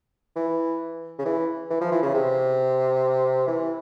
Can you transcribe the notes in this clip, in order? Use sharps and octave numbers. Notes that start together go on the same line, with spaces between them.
E3
C#3
E3
E3
F3
E3
C#3
C3
E3